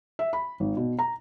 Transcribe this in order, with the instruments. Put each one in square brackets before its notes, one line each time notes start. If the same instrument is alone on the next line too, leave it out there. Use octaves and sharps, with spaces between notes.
[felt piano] E5
B5
G#1
B2
A#5